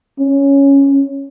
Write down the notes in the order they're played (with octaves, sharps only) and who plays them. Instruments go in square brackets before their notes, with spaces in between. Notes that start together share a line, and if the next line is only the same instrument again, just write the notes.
[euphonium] C#4